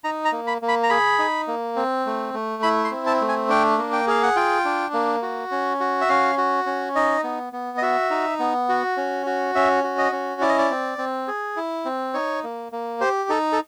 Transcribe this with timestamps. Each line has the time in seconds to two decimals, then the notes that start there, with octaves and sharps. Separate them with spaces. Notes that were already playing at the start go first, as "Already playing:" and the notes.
0.04 D#4 A#5
0.25 A#5
0.32 A#3
0.47 B5
0.62 A#3
0.68 B5
0.83 A#5
0.90 G#4 B5
1.19 D#4
1.47 A#3
1.76 C4
2.06 A3
2.34 A3
2.63 E4 B5
2.85 C6
2.91 C4
3.06 A5
3.21 A3
3.28 G#5
3.49 D4 G5
3.78 A#3
3.93 G5
4.07 G#4 F5
4.23 F#5
4.36 F4 G5
4.65 D4
4.94 A#3
5.22 F#4
5.51 C#4
5.80 F#4
6.01 E5
6.09 C#4 F5
6.38 F#4
6.66 C#4
6.95 D#4 D#5
7.24 B3
7.53 B3
7.78 D#5
7.82 F#4 E5
8.10 D#4
8.39 B3
8.69 F#4
8.97 C#4
9.26 F#4
9.55 C#4 E5
9.84 F#4
9.98 D#5
10.12 C#4
10.41 E4 D5
10.49 D#5
10.58 D5
10.70 C4
10.98 C4
11.28 G#4
11.56 E4
11.85 C4
12.14 D#4 C#5
12.44 A#3
12.72 A#3
13.01 G4 C5
13.29 D#4 A4
13.52 A4